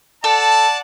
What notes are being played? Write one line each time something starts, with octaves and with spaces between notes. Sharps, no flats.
A4 D5 F#5 A5